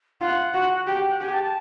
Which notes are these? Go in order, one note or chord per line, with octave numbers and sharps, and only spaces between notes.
F4 F#5
F#4
G4 G5
G5
F#5
G4 G#5
A5
A5